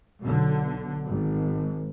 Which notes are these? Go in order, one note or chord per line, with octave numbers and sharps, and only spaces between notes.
B1 D3
G#1